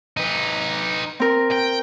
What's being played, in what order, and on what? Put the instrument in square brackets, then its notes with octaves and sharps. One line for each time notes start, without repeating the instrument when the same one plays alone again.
[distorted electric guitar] D#4 B4
[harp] C4 A#4
[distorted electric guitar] G5